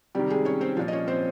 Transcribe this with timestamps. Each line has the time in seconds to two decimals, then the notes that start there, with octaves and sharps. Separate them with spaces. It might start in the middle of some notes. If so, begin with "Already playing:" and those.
0.15 C3 D#3 G3 G4
0.30 G#3 G#4
0.45 C#4 C#5
0.61 C4 C5
0.77 A#2 F3
0.88 D#5
0.93 C#4 C#5
1.08 C4 C5